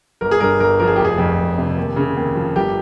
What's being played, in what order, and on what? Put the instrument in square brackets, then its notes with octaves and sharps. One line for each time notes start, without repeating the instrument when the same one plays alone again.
[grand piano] G1 A#4
G#4
G2 A#4
G1 A#4
F3 A#4
G#4
F1 G4
G#4
F2
F1
C3
D#2
C#3
D#2
F3
G1 G4